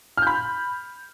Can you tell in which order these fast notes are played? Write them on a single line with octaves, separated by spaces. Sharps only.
F6 G6 B5